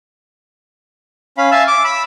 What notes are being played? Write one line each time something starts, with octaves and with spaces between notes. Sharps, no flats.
C#4 F5 B5
E5 F5 G#5 A5 E6
D6
B5 E6